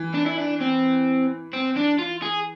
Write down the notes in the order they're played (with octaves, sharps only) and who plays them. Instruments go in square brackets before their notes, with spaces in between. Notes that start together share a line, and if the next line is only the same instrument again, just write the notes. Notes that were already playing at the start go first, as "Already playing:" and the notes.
Already playing: [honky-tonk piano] E3
[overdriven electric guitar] D4
E4
D4
C4
C4
D4
F4
G#4